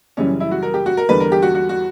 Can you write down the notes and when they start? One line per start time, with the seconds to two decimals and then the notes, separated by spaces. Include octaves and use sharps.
0.17 F#2 C#3 E3 G3 C#4
0.40 E4
0.51 F#4
0.62 A#4
0.74 G4
0.86 F#4
0.97 A#4
1.09 E2 D3 G3 B4
1.20 A#4
1.32 G4
1.42 F#4
1.55 F#4
1.69 F#4